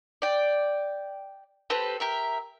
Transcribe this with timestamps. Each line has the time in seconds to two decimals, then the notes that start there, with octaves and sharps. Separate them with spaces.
0.22 D5 G5
1.70 C4 G4 A4 B4
2.00 G4 A#4 E5